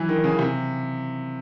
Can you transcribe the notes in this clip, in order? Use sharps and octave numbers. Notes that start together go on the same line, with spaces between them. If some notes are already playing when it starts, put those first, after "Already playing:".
Already playing: E3 F#3
D#3
C#3
C3